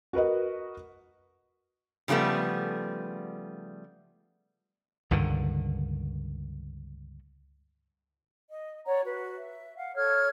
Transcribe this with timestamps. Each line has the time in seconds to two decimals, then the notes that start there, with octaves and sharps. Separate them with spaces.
0.13 F#4 A#4 B4 D#5
2.08 C#3 F3 G3 A3 B3
5.11 C#2 G2 D3 D#3
8.49 D#5
8.86 C#5 D5 F#5 A#5
9.04 F#4 B4
9.36 E5
9.75 F5 F#5
9.95 A4 C#5 F6 G#6